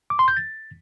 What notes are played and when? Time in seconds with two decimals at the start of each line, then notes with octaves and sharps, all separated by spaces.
0.10 D6
0.19 C6
0.28 G6
0.37 A6